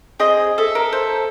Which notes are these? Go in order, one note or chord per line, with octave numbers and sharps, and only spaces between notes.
C4 G#4 D#5 C6
A4 E5
A#4
C5